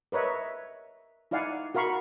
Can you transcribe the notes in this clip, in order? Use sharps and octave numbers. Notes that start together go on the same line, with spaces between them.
A#4 B4 C#5 D#5 E5
D#4 E4 D5 F5 F#5 G#5
F#4 A#4 F5 B5 C#6